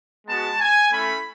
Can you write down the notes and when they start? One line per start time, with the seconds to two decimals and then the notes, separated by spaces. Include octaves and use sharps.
0.28 G#3 B3 F#4 A5
0.60 G#5
0.92 A3 C#4 E4 B5